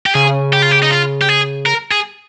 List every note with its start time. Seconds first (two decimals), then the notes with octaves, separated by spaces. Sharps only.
0.06 G4
0.15 C#3 G#4
0.53 G4
0.62 F4
0.71 G4
0.83 D#4
0.90 F4
1.22 G4
1.29 G#4
1.66 A#4
1.91 G#4